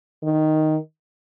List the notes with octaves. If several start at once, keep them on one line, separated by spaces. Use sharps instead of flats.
D#3